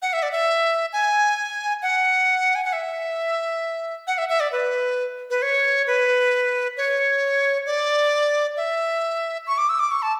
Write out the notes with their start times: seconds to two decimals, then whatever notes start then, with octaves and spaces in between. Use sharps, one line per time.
0.02 F#5
0.13 E5
0.23 D5
0.32 E5
0.93 G#5
1.82 F#5
2.55 G#5
2.65 F#5
2.73 E5
4.07 F#5
4.18 E5
4.29 E5
4.40 D5
4.52 B4
5.30 B4
5.42 C#5
5.87 B4
6.77 C#5
7.66 D5
8.57 E5
9.47 C#6
9.58 D6
9.69 E6
9.79 D6
9.91 C#6
10.02 A5